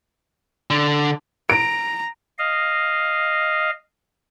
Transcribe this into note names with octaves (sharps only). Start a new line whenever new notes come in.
D3
A#5 D7
D#5 F5